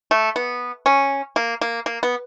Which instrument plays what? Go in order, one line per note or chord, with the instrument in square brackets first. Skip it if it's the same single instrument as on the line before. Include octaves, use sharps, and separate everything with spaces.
[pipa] A3
B3
C#4
A#3
A#3
A#3
B3